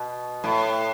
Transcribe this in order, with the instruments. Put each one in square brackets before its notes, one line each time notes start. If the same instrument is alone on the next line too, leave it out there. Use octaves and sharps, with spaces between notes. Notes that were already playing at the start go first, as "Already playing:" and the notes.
Already playing: [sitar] B2
A2